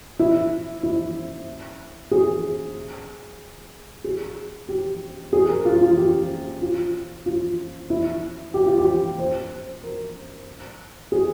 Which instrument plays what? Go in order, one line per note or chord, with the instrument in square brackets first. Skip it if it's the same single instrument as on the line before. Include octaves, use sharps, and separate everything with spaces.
[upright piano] E4
E4
G#4
G#4
G4
G#4
A#4
F4
F4
G4
F4
F4
E4
G4
F4
G4
C5
A#4
G#4